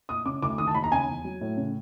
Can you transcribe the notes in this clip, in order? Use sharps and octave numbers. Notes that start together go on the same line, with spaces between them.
A#2 D#6
C#3 D6
D2 D6
D#3 D#6
A5
D#2 B5
A#5
C#3 G#5
E2
F#3
A2
C#3